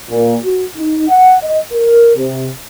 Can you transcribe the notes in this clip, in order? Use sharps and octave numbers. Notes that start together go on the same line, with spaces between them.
A#2
F#4
D#4
F#5
D#5
A#4
C3